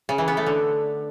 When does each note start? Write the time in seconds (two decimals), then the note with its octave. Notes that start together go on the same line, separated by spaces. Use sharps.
0.09 C#3
0.18 E3
0.28 B3
0.37 A3
0.46 D3